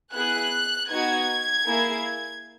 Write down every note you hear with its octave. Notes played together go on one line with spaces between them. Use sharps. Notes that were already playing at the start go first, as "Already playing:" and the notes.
B3 E4 G#4 F#6
B3 D#4 F#4 G#6
A#3 E4 G#4